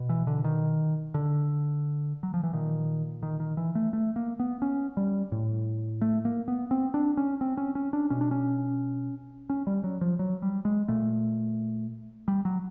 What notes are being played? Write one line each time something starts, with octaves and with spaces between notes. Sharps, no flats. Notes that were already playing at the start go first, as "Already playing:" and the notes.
Already playing: B2
E3
D3
D#3
D3
F#3
F3
E3
A#2 D#3
D#3
D#3
E3
A3
A3
A#3
B3
C#4
G3
A2
A3
A#3
B3
C4
D4
C#4
C4
C#4
C#4
D4
B2 C#4
D4
C#4
C#4
G3
F#3
F3
F#3
G3
G#3
A#2 A3
G3
F#3